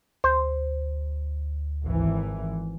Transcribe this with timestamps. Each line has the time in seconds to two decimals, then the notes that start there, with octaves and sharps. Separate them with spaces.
0.24 D2 C5
1.85 G#1 E3